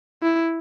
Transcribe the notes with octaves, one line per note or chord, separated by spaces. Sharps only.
E4